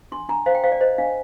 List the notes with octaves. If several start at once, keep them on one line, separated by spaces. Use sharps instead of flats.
D4 C6
D4 A#5
C5 F5
G5
C5 F5
D5
C5 D#5
D4 F5